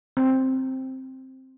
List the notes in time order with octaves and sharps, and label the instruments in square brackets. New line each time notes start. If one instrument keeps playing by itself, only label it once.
[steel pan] C4